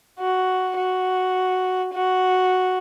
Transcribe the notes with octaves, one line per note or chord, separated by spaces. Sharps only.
F#4
F#4
F#4